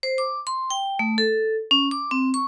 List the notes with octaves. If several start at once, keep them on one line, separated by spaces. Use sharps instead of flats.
C5
D6
C6
G5
A3
A4
C#4
D6
C4
C#6